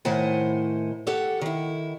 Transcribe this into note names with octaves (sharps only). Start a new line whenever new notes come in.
A2 D#3 E4 C5 F#5 G#5
G4 A4 C#5 F#5
D#3 E4